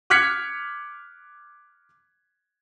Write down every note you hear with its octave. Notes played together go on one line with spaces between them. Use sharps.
D6 F6 F#6 G#6 B6 C#7